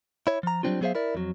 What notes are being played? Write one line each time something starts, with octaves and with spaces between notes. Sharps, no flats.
E4 C#5
F3 A#5
F#3 G3 A#3 C4 D4 F4
F#3 B3 G#4 C5 E5 F5
E4 A#4 D5
F2 F#3